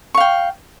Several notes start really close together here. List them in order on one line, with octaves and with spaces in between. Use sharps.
C#6 F5 G5